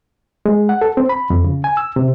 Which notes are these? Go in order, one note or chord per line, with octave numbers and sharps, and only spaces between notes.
G#3
F#5
A4
C4
B5
F2
C#3
G#5
E6
C3